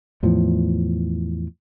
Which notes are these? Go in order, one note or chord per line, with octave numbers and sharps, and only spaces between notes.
E2 A2 F3